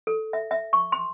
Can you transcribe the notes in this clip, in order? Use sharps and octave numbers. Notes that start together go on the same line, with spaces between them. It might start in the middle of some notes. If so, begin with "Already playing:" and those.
A4
E5
E5
C#6
C6